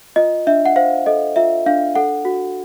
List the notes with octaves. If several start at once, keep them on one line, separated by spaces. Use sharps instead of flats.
F4 D#5
D4 E5
F#5
C5 F5
A4 D#5
F4 E5
D4 F5
A4 F#5
F#4